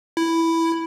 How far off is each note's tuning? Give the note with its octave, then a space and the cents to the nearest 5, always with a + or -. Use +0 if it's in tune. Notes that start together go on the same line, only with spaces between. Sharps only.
E4 +0